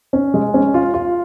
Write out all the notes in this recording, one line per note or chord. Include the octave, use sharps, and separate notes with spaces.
C#4
G#3
C#4
F4
F4